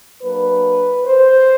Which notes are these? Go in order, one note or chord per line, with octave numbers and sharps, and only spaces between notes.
F#3 A#3 D4 B4
C5